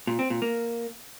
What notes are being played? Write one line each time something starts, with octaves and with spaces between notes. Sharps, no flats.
A#2
C4
A#2
A#3